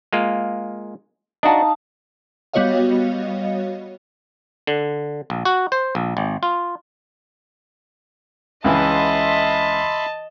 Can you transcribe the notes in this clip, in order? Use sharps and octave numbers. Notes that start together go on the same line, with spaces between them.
G#3 A#3 F4
D4 D#4 F#4 F5 A5
G3 B3 F#4 C#5 D#5 F5
D3
A#1
F#4
C5
A#1
G#1
F4
C#2 C#3 E3 D#5 E5 A5 B5 C6